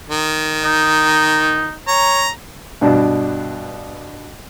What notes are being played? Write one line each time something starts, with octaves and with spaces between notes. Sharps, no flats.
D#3
D#4
C#5 A#5
G2 B2 D4